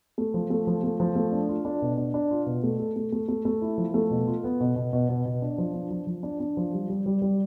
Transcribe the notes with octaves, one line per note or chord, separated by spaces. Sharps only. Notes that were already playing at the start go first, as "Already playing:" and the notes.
A3
F3
A3
F3
A3
F3
A3
D4
F4
D4
B2
D4
D4
F4
B2
A3
A4
A3
A3
A3
A3
E4
F3
A3
B2
F4
B3
B2
B2
B2
B2
B2
D4
F3
D4
F3
F3
D4
D4
F3
G3
G3
G3
G3